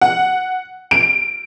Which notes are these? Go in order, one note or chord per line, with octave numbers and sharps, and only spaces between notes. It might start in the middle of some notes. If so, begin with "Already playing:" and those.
F#5
D7